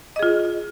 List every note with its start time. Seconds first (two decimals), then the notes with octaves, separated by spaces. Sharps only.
0.16 D#5
0.19 G#4
0.23 F4